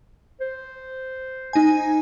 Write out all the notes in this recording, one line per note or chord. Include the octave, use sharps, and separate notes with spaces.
C5
D#4 G#5